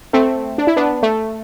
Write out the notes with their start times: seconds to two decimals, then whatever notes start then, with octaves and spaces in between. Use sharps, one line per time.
0.13 A3 C4
0.58 D4
0.67 E4
0.76 B3 D4
1.03 A3